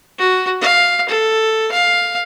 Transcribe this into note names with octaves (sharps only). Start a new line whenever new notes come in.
F#4
F5
A4
F5